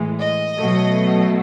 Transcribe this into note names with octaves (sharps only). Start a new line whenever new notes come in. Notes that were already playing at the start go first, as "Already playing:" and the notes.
Already playing: A2 E3 G#3
D#5
B2 F#3 A3